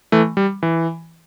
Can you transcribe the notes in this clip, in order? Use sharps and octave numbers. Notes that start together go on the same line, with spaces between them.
E3 A3
G3
E3